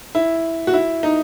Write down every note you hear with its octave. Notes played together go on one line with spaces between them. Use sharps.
E4
F#4
E4
D#4